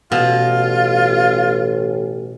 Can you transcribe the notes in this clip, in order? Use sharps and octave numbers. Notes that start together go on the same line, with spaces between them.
A1 B2 F4